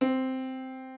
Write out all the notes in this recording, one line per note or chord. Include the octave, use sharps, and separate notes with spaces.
C4